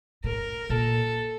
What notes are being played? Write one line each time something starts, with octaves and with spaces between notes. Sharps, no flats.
A2 A#4
A#2 A4